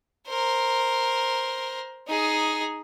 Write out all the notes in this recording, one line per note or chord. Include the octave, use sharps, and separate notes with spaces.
A#4 C5
D#4 G#4